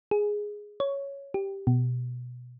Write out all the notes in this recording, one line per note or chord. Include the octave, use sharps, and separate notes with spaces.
G#4
C#5
G4
B2